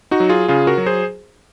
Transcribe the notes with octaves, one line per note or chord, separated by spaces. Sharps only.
D#4 F#4
F#3
F4 G#4
C#3 F4 G#4
F#4 A#4
F#3
G#4 C5